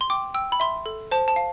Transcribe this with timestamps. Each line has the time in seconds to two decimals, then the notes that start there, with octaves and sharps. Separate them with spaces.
0.01 C6
0.10 G5 D6
0.34 G5 E6
0.52 B5
0.60 E5 C6
0.86 A4
1.11 C5 A5
1.28 A5
1.36 F5